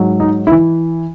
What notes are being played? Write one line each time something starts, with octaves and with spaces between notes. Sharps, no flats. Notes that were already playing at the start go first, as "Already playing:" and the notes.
Already playing: G#2 F#3
D#4
E4
E3